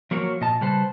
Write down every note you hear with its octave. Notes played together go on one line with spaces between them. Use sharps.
F3 F#3 A#3 F#4 A#4 C#5
A#2 D#5 A5
C#3 G3 B4 C5 A5